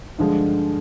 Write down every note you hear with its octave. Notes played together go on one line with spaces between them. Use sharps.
G2 D3 F3 G#3